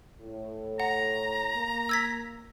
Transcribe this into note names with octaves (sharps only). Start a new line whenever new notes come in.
A2
F#5 A#5
A#3
E6 G#6 B6